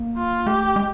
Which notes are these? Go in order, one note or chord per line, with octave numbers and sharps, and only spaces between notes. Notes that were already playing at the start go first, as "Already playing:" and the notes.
Already playing: A#3
F4
A3 G4
G#3